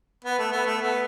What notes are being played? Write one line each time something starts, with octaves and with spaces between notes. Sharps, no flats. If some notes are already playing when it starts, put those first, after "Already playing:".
B3
A3
B3
A3
B3